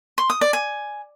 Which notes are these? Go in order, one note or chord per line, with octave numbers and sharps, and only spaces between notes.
C6
D#6
D5
G#5